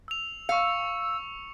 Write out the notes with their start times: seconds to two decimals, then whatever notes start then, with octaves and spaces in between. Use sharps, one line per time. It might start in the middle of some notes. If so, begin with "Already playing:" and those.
0.08 E6 F7
0.49 F5 C#6 E6 C#7